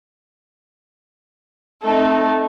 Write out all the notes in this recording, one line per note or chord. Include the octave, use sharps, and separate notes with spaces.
A3 C4 D#4 A4